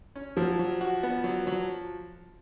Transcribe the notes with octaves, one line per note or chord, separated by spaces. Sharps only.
C#4
F3 F#3
F#3
F#4
B3
F#3
F#3